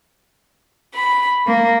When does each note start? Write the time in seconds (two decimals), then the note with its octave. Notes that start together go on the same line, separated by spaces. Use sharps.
0.93 B5
1.46 A#3